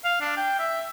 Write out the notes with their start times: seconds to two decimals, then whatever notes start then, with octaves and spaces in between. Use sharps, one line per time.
0.04 F5
0.21 D4
0.37 G5
0.59 E5